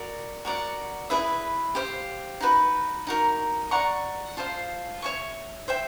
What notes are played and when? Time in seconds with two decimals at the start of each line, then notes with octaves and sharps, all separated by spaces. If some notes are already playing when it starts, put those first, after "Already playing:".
Already playing: F#4 A#4 D5
0.45 F#4 A#4 D5 F#5
1.10 E4 G#4 B4 E5
1.75 G4 C5 F5
2.41 D#4 F#4 B4
3.07 D#4 F#4 A#4
3.71 D5 F#5 A#5 C#6
4.37 F4 A4 C5 F5
5.02 C#5 E5 G#5 C#6
5.68 C5 E5 G5